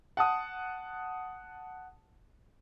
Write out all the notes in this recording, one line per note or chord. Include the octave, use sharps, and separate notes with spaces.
F#5 A5 D#6